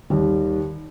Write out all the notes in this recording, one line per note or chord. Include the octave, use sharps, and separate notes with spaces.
D#2 D#3 G3